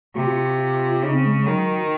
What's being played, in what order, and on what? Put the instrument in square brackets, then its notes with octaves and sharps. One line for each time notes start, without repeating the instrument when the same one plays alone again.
[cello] C3 [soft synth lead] F#4
[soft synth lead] F4
F4
F4
[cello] C#3 [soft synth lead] D#4
[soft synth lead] C4
G#3
G#3
[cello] D#3 [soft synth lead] F#3